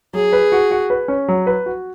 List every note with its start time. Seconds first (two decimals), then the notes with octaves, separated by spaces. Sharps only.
0.13 F#3 G#4
0.33 B4
0.52 F#4
0.71 F#4
0.90 B4
1.08 C#4
1.28 F#3
1.47 B4
1.66 F#4